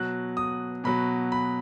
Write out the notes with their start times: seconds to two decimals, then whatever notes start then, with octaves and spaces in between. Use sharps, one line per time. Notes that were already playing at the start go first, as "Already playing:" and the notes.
Already playing: B2 F#3 F#6
0.37 D#6
0.84 B2 F#3 B5
1.32 B5